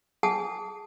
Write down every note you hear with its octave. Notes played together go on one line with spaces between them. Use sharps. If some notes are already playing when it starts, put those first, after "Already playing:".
G#4 F#5 G#5 A5 D#6